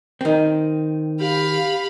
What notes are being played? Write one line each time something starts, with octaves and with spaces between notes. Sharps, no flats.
D#3 C4
G4 F5 B5